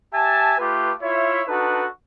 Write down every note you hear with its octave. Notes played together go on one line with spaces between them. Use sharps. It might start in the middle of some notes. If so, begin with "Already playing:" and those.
G4 E5 G#5 A5
A3 F4 G4 B4
E4 F4 C#5 E5
D4 D#4 F#4 A4 B4